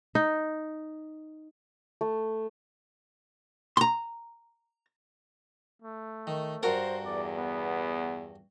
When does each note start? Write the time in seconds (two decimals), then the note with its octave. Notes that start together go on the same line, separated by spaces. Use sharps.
0.15 D#4
2.01 A3
3.77 A#5 C6
5.82 A3
6.27 D#3
6.63 G2 F#4 A4 A#4 C5
7.05 E2 D5
7.38 B3